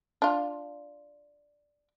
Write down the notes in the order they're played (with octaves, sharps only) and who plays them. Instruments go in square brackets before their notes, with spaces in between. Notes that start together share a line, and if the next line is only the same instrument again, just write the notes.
[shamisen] D4 F4